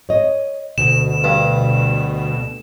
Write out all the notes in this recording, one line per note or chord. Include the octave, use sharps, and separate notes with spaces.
C#5 D#5
D2 B2 E7
G2